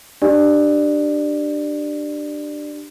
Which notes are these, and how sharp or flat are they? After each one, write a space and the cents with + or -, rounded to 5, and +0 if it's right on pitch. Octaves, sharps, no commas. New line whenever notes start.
D4 +20 G4 -10 D5 +20